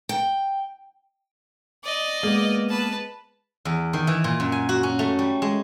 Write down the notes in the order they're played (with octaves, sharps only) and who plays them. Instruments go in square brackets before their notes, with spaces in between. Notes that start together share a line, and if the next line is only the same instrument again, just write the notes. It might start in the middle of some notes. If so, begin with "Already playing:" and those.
[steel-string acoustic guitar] G5
[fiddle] D5 D#5
[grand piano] G#3 [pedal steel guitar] A#3 B3
[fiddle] B4 A5
[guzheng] E2
D#3
E3
A#2
F#2
G#5
F#4
C#4
A3
G3
G#3